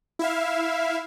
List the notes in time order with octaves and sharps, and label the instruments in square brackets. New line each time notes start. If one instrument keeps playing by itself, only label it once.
[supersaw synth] E4 E5 F5